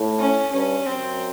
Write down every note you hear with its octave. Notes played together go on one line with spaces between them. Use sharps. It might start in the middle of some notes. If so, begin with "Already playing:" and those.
Already playing: A2
C#4
G2 C#4
F#2 C4